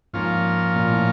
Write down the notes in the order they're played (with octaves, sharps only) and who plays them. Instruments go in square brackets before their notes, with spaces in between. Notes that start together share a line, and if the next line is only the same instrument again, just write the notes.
[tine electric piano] G#2 [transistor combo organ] F3 A#3 C#4 F4
[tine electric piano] A#2
A2